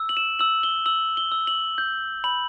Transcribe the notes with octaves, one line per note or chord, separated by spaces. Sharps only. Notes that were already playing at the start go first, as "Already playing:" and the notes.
Already playing: E6
F#7
E7
E6 F#7
G7
E6 F#7
G7
E6
F#7
G6
B5 F#7